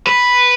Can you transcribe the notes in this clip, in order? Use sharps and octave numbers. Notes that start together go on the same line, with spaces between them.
B4